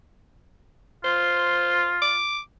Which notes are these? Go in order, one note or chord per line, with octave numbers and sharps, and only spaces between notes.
F4 C5
D6